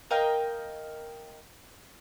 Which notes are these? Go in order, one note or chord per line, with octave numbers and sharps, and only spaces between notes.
A#4 D#5 F5 G5